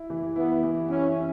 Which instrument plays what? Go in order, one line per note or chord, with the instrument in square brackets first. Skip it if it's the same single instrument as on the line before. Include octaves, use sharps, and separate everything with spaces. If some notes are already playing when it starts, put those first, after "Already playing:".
Already playing: [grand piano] E4
E3
[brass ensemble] B3 [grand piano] E4
[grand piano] E3
[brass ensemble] C#4 [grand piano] E4
[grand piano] E4